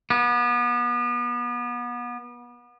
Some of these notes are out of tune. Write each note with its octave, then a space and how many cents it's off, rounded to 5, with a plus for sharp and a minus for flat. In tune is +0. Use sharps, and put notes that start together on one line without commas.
B3 -30